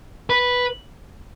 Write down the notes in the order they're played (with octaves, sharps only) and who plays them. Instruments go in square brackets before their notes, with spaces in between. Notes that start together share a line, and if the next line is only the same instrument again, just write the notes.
[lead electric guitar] B4